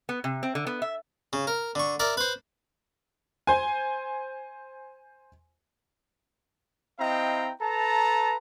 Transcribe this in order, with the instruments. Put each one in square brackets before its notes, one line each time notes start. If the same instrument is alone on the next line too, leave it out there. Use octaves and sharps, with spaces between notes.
[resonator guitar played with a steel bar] B3
C3
C4
D3
B3
E5
[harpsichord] C#3
A#4
D3 C#6
A#4 D5 E5
B4 C5
[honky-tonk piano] C5 G#5
[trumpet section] C4 E4 D#5 F5 G5 A#5
A4 B4 A5 A#5